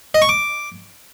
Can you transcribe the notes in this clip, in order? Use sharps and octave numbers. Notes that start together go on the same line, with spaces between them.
D#5
C#6
D6